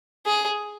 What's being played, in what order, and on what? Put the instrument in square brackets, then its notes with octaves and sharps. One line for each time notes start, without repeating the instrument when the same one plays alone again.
[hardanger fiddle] G#4